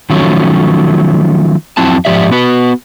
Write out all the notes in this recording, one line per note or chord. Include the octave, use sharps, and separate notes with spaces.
D#3 F3 F#3 A3 C#4
F2 F#3 C4 E4 A5
G#2 E3 F3 G4 D5 E5
B3 F#4 B4